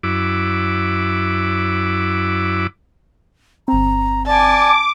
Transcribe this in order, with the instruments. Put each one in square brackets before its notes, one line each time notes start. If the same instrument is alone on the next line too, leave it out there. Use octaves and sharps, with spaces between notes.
[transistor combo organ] F#2 E4 D6
[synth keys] G1 C4 [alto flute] A#5
[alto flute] D5 [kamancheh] G#5 A5 [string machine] D6